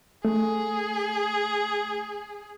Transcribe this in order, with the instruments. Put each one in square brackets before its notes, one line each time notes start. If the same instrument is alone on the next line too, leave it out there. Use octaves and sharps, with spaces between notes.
[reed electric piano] A3 [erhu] G#4